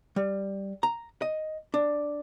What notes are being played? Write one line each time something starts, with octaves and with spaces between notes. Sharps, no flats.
G3
A#5
D#5
D4